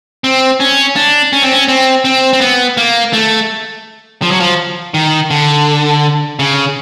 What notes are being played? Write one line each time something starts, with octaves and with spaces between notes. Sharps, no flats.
C4
C#4
D4
C#4
C4
C#4
C4
C4
C4
B3
A#3
A3
F3
F#3
F3
D#3
D3
C#3